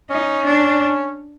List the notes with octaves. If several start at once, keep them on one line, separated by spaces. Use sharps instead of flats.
C#4 D#4
D4